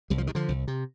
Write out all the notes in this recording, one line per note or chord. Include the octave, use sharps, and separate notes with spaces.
C2 G3
F3
C3 D#3
D3 F3
C2
C3